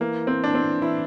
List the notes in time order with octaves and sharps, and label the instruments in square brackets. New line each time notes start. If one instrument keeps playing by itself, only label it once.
[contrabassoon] E3 [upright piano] A#3
[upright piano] C4
D4
C4
[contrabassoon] E3 [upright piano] E4